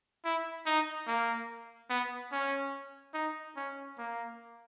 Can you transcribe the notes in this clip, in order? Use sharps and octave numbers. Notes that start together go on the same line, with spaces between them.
E4
D#4
A#3
B3
C#4
D#4
C#4
A#3